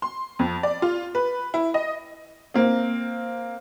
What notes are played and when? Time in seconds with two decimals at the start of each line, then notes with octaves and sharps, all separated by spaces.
0.02 C6
0.39 F2
0.63 D5
0.82 F4
1.15 B4
1.54 E4
1.74 D#5
2.54 A#3 C4